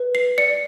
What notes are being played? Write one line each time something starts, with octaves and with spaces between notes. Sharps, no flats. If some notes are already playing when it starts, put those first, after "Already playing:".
Already playing: B4
C7
D5 C#7